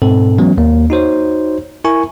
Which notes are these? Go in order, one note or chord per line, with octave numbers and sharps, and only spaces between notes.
G#2 B2 C4 A4
E3 F#3 G#3 B3 C#4
D#2 A#3
D#4 F#4 C5 C#5
E4 A#4 G#5 C#6